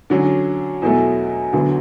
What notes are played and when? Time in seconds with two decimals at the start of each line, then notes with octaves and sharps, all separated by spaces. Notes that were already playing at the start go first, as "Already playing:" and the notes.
0.10 D3 F#3 C#4
0.82 E2 B2 F#3 A3
1.53 D2 D3 F#3 B3